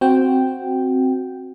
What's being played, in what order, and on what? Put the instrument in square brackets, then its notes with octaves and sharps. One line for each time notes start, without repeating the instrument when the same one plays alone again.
[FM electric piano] C4 F#4 G5